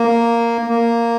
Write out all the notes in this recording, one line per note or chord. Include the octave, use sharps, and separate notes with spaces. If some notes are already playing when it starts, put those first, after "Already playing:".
Already playing: A#3
A#3